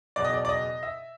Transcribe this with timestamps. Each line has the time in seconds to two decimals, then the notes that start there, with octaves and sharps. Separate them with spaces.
0.16 F#1 E2 B2 D5
0.24 D#5
0.33 D5
0.45 D5
0.49 D#5
0.83 E5